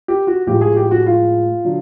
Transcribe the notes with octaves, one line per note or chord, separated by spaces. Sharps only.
G4
F#4
A2 F3 G#3 G4
G#4
G4
F#4
F4
D3 F#3